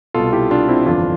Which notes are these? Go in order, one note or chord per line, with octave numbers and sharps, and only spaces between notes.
C2 B2 F4 A4
E4 G4
D4 F4
C4 E4
G1 F2 E3 D4 F4